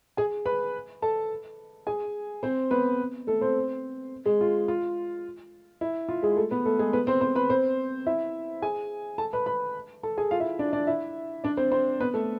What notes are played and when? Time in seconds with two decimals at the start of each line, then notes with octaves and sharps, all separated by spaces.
0.17 G#4 G#5
0.46 B4 B5
1.02 A4 A5
1.87 G#4 G#5
2.43 C4 C5
2.71 B3 B4
3.27 A3 A4
3.41 C4 C5
4.26 G#3 G#4
4.41 F4
4.68 F4
5.81 E4
6.09 F4
6.23 G#3 G#4
6.37 A3 A4
6.51 B3 B4
6.66 A3 A4
6.79 G#3 G#4
6.93 B3 B4
7.07 C4 C5
7.21 C4 C5
7.35 B4 B5
7.50 C4 C5
8.06 E4 E5
8.62 G#4 G#5
9.18 A4 A5
9.33 B4 B5
9.46 B4 B5
10.03 A4 A5
10.18 G#4 G#5
10.31 F4 F5
10.40 E4 E5
10.59 D4 D5
10.73 D4 D5
10.87 E4 E5
11.44 D4 D5
11.57 C4 C5
11.71 C4 C5
12.00 B3 B4
12.14 A3 A4